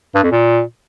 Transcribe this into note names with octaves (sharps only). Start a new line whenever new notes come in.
G2
F2
A#2